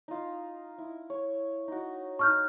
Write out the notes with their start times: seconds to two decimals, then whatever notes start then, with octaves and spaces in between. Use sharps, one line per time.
0.08 D#4 F4
0.78 E4
1.10 C#5
1.68 D#4 F#4
2.19 D#4 D#5 A5 C#6 F6 G6